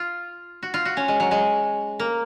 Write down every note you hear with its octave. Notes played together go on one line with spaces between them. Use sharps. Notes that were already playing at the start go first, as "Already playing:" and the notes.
Already playing: F4
F#4
F4
F#4
C#4
G#3
F#3
G#3
A#3